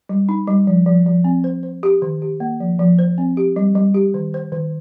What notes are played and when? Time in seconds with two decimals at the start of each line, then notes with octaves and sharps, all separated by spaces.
0.09 G3
0.29 D#4
0.47 G3
0.67 F3
0.86 F3
1.06 F3
1.24 C4
1.44 C5
1.63 C5
1.83 G4
2.02 D#3
2.22 G4
2.40 A#3
2.60 F3
2.79 F3
2.99 C5
3.18 C4
3.37 G4
3.56 G3
3.75 G3
3.94 G4
4.14 D#3
4.34 C5
4.52 D#3